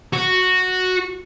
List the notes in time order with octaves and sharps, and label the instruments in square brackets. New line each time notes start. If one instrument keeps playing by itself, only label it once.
[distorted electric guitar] F#4